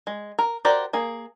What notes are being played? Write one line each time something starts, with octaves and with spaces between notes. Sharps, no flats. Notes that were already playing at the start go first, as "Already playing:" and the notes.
G#3
A#4
F#4 G4 A#4 C5 D5
A#3 G#4